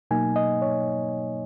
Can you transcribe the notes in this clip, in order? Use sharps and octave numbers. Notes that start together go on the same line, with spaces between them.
B2 F#3 A#3 D#4 G#5
D#5
C#5